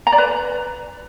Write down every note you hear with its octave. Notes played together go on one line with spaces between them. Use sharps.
A#5
D5
B4